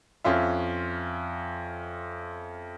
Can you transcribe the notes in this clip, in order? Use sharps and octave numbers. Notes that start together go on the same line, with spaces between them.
F2 C#4 F4 E5